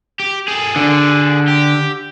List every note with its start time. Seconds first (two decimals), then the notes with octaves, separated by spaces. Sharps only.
0.20 G4
0.48 G#4 A4
0.76 D3
1.48 G4